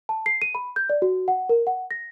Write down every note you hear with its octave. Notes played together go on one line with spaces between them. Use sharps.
A5
C7
D#7
B5
G6
D5
F#4
F#5
A#4
F#5
A#6